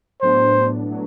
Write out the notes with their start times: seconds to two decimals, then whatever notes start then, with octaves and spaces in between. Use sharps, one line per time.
0.21 A2 F#3 B3 D4 C5
0.90 A2 F#3